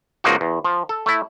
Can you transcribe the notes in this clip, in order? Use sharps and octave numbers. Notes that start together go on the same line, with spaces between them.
C#2 F3 A#3 D#4 F#4
E2
F3
A4
A3 E4